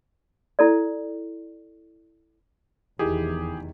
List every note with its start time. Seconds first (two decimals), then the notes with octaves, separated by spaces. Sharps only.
0.59 E4 A4 D5
2.99 F1 E2 D#3 E3 E4 G4 G#4